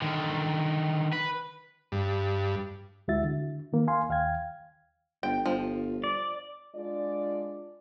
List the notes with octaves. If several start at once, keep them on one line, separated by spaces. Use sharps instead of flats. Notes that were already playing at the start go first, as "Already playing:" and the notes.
D3 D#3
B4
G2
D2 G#3 E4 F#4 E5 A6
D3
D#3 A#3
F5 G#5 C6
D#2 F5 G5 G#6
G1 G5
G1 F3
D5
G#3 D4 F4 D5